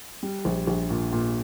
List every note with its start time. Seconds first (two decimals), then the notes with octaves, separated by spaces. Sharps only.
0.23 G3
0.45 A#1
0.67 A#1
0.90 A#2
1.13 A#2